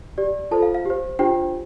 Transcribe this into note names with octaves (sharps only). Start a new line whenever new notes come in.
G4 D5
F4 A4 C5 A5
F5
F5
G4 C5
D4 F4 G4 C5 G5